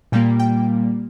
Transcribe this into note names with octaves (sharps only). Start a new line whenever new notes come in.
A#2 G3 A#3 G5
G5